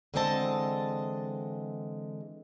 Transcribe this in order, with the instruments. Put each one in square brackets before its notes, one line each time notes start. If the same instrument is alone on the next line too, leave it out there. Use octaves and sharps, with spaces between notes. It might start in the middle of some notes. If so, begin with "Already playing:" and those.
[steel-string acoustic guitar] D3 E3 G#3 C4 D#5 A5